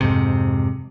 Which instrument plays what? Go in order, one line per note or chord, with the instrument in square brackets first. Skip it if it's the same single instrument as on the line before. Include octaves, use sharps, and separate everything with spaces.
[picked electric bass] F2 G#2 C3